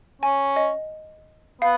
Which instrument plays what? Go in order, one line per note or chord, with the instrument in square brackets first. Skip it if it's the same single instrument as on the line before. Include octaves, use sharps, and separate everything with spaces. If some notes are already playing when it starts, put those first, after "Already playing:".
[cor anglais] C#4 [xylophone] G#5
[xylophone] D#5
[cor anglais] B3 [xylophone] F5